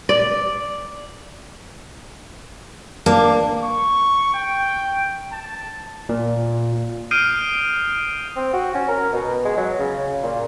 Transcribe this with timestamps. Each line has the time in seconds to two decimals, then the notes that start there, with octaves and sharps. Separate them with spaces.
0.09 D5
3.06 A#3 D4
3.63 C#6
4.34 G5
5.32 A5
6.09 A#2
7.11 D#6 F6 G6 C7 D7 D#7
8.36 C4
8.53 F#4
8.75 C#4
8.88 A#4
9.13 B2
9.45 G#3
9.57 F#3
9.79 C#3
10.23 A#2